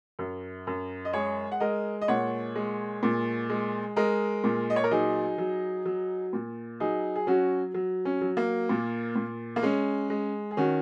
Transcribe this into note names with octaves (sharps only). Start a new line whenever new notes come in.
F#2
F#2
D#5
G#3 G#4 C#5
F#5
G#3 A#4 D#5
D#5
A#2 C#5 F#5
G#3
A#2
G#3
G#3 A#4 D#5
A#2
D#5
C#5
A#4
F#3 D#4 G#4
F#3
F#3
A#2
F#3 D#4 G#4
G#4
F#3 C#4 F#4
F#3
C#4
F#3
A#3
A#2
A#2
A#3
G#3 C#4
G#3
G#4
D#3 C#4 F#4